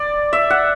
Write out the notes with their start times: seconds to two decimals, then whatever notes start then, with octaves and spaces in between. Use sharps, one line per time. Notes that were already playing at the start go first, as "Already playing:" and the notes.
Already playing: D5
0.33 E5
0.50 F#5